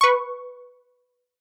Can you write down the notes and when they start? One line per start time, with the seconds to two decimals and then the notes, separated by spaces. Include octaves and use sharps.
0.01 B4 C#6